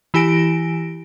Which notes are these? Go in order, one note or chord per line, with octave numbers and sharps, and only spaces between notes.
E3 E4 G4 G#5 A#6 D7